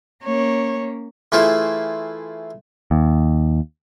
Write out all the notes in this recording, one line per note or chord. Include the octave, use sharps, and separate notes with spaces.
A#3 C#4 C#5
E3 A3 E4 F4 G#4 C5
D#2